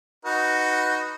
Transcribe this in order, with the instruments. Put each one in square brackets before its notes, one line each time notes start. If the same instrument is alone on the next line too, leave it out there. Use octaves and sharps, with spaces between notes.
[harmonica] D#4 F#4 B4